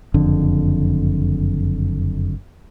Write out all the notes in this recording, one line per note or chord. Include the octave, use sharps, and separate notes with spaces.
F#1 F2 D3